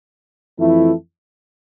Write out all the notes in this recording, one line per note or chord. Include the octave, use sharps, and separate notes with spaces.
F2 E3 A3 E4